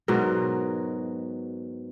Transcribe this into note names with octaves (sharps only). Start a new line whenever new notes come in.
G#2 B2 F#3 A#4